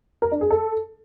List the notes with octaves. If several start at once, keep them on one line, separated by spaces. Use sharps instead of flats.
A#4
D4
G#4
A4